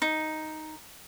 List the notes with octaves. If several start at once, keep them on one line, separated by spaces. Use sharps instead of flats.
D#4